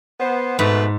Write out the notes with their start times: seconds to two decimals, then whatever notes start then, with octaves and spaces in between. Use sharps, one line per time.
0.20 B3 C5
0.59 G#2 B2 A3 B4